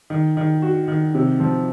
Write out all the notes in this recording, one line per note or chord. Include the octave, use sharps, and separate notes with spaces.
D#3
D#3
F#4
D#3
C3
F3